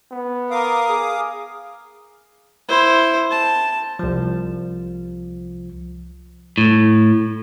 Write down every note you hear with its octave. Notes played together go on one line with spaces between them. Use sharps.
B3
A#4 F5 D6 D#6
G#4
E4 C5
A5
C2 F3
A2